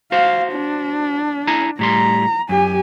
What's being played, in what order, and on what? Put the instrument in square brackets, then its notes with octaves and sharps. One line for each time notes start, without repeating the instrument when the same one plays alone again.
[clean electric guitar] F#4 C5 [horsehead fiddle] F5
[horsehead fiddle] D4
[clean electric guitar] E4 G#5 A#5
[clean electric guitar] A2 G3 C6 [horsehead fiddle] A#5
[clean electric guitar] F#2 [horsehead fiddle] G4 G#5